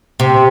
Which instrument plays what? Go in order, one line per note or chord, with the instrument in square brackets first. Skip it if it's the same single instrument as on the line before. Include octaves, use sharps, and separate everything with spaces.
[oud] C3